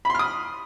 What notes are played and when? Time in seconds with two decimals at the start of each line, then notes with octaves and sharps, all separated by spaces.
0.05 B5
0.10 C6
0.15 F6
0.19 D#6